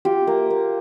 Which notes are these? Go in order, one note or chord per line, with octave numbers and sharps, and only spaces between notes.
F4 G4
A#3
A#3